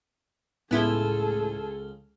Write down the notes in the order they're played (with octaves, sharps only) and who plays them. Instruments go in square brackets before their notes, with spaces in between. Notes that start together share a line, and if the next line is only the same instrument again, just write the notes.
[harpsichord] C#2 C#3 C6 [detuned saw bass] A2 [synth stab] B3 E4 [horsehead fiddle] G#4 A4